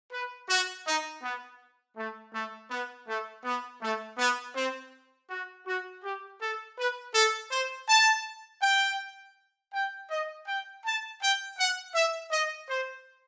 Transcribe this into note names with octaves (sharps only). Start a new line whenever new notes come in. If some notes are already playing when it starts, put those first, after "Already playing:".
B4
F#4
D#4
B3
A3
A3
B3
A3
B3
A3
B3
C4
F#4
F#4
G4
A4
B4
A4
C5
A5
G5
G5
D#5
G5
A5
G5
F#5
E5
D#5
C5